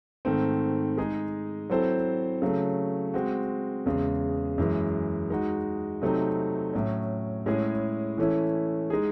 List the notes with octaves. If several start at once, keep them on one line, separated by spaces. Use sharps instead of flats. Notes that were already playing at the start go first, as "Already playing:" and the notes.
G#2 D#3 A3 C4
G#3 D#4 G#4
F#3 C4 E4 A4 C5
C#3 F#3 A3
G#3 C4 F#4
E2 C#3 G#3
F#2 E3 G#3
G#3 D#4 F#4
C3 F#3 A3 C4 D#4
A2 F#3 C#4
A2 G#3 C#4 E4 G#4
E3 A3 C#4 E4
G#3 D#4 G#4